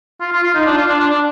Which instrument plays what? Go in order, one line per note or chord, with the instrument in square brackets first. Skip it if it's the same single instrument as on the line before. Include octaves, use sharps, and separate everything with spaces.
[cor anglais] F4
F4
F4
D#4
D4
F4
D4
D4
D4